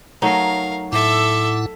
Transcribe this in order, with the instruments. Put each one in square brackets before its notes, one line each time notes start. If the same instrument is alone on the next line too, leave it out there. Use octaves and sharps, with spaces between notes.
[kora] F#3 A3 D#4 [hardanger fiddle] A#4 F5
[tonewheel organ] A2 E4 F#5 [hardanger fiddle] A4 E5 [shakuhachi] D6